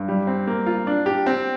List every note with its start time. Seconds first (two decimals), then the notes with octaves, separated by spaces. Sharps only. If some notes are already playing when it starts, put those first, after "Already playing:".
Already playing: G2
0.08 G3
0.27 C4
0.47 A#3
0.66 F4
0.87 D4
1.06 G4
1.26 C4